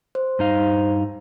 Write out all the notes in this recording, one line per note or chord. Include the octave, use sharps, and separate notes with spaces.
C5
G2 D#4 F5